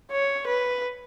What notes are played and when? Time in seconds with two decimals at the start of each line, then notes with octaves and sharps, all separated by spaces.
0.11 C#5
0.46 B4